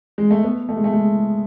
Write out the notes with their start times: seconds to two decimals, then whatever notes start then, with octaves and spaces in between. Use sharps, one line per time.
0.18 G#3
0.30 A3
0.43 B3
0.69 A3
0.77 G#3
0.84 A3
0.93 G#3